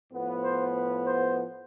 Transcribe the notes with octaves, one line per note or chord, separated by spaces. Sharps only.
A2 F3 B3
C5
B4
C5